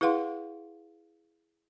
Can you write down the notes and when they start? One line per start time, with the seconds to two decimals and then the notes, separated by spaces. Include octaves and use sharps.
0.01 E4 G#4 B4 F5 F#5 C6